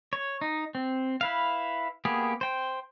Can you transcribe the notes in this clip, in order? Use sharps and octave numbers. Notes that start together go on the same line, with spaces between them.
C#5
D#4
C4
E4 B4 F5
A#3 B3 G4 G#4
C5 G5